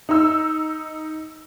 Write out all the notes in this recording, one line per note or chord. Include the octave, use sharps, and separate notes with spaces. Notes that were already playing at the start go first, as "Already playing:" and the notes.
D#4 E6